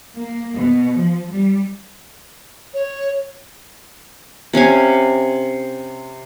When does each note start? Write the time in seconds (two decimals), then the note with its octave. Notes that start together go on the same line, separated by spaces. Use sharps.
0.15 A#3
0.54 B2
0.97 F3
1.29 G3
2.74 C#5
4.53 C3 C#4 F5 G#5